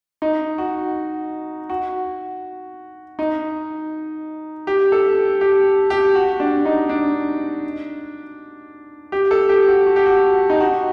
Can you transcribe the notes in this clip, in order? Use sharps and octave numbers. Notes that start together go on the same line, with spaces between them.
D#4
F#4
F#4
D#4
G4
A4
G4
G4
F#4
D4
D#4
D4
G4
A4
G4
F#4
F#4
G4
F#4
D#4
F#4